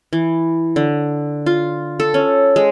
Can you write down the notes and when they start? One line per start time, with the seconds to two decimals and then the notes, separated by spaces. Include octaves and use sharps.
0.13 E3
0.76 D3
1.46 F4
2.00 A4
2.14 C#4
2.56 G#3